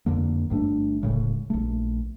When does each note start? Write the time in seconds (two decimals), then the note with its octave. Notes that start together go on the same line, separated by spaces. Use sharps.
0.06 F2 D3 A#3
0.50 G1 G2 A3 D4
1.01 D1 A2 C#3 G#3
1.50 A#1 A3